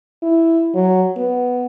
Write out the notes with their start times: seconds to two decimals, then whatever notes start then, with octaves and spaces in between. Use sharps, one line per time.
0.23 E4
0.74 F#3
1.17 B3